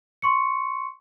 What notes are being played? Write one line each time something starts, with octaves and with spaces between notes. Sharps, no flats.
C6 C#6 C#7